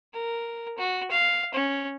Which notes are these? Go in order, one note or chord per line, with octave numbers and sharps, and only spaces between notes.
A#4
F#4
F5
C#4